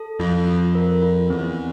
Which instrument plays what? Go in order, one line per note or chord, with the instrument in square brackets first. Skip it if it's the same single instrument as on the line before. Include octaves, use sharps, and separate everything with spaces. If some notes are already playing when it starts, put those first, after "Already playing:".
Already playing: [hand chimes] A4
[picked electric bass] F2 [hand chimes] F4
[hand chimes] F4
A#4
F4
[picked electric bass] E2 [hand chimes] C4